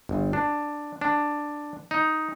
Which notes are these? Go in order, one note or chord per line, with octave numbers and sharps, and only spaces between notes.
G1
D4
D4
D#4